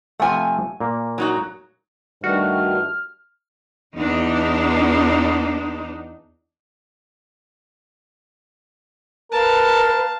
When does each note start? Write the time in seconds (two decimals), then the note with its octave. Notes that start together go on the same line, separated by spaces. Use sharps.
0.20 C3 F3 A3 F#5 G#5
0.80 A#2 A#3
1.18 F#3 D#4 F#4
2.24 G2 D#3 G3 A3 F#4 F6
3.97 E2 D4 D#4
9.32 A#4 B4 F5 A5